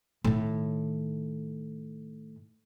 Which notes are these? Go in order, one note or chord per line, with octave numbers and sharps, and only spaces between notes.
A2 D#3